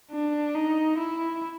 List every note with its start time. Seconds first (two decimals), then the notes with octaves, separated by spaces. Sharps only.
0.11 D4
0.55 D#4
0.98 E4